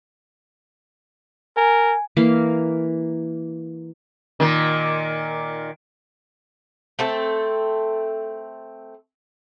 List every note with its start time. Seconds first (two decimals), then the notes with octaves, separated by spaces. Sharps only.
1.57 A#4 G#5
2.17 E3 A#3 F5
4.40 A#2 D#3
6.99 A3 C4 A4